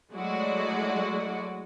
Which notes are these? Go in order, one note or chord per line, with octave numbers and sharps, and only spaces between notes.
F#3 G#3 A3 E4 F#4 D5